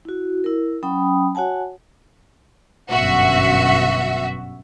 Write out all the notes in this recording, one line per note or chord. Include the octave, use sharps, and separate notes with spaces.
E4 F#4
E4 A#4
F#3 C#4 G5 B5 D#6
F#4 C#5 F#5 G#5 A5
G1 F#2 B2 F#4 E5